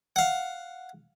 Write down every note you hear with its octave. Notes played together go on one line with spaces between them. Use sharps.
F5 F#5